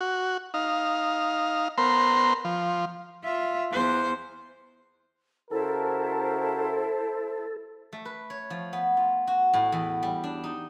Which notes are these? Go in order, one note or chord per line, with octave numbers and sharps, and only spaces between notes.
F#4
D#4 F5
B3 A#4 C5 C6
F3
F4 E5
E2 C5
C#3 E4 F#4 A4 A#4 C5 A5
A3
B4
C#5
F3
B3
F4
F#4
A2
E2
G3
D4
D#4